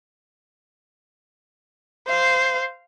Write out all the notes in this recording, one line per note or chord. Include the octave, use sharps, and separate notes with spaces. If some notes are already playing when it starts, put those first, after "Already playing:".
C5 F5